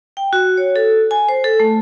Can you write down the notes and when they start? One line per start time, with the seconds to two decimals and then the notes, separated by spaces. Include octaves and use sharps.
0.17 G5
0.33 F#4
0.57 C#5
0.76 A4
1.11 G#5
1.29 C5
1.44 A4
1.60 A3